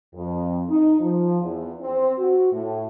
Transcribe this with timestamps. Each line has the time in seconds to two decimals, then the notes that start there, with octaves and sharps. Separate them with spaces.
0.15 F2
0.69 D#4
1.01 F3
1.41 E2
1.81 C4
2.18 F#4
2.52 A2